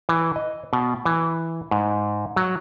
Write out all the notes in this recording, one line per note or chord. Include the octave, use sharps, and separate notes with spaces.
E3
D#5
B2
E3
G#2
F#3